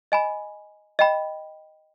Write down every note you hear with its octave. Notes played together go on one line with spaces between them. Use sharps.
D#5 G#5 B5
D#5 G5 B5